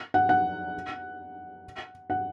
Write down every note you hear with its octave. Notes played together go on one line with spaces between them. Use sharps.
F#5
F#5
F#5